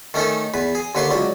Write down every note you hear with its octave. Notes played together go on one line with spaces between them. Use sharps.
D#3 A3 C#4 D#4 A4
E2 B4
G#4
D#2 D3 B4 C#5 C6 D6
C#2 F#3 D5